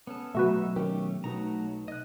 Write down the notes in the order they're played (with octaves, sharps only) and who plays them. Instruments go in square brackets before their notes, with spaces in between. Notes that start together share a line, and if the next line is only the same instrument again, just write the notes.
[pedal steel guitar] B3 C#4 A4
[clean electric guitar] B2 F3 F#3 [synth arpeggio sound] A3 F#4 B4 [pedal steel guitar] D#4 E5
[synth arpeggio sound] D#3 [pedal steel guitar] A3 C#4 G4
[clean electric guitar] B1 D#4 B4 [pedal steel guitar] F#3 A3 A#5
[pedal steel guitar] D#5 F#6